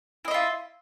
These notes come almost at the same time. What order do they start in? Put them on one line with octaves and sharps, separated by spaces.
E4 D#5 E5 F4